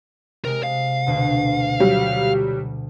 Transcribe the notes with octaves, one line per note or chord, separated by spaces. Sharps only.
C3 G#3 A#4
F5
D2 B2 D3
F#3 G3